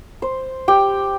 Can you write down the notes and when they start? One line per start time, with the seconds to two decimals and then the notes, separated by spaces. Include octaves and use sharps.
0.22 C5
0.68 G4 G5